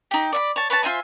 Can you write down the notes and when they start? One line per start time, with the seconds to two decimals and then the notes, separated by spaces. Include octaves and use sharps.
0.11 D#4 G4
0.33 D5 E5 B5
0.56 C#5 A5
0.70 B4 C#5 G5 A5
0.83 F4 C5 E5 G#5